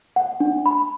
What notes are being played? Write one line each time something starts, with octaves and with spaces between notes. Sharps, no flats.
F#5
D4
B5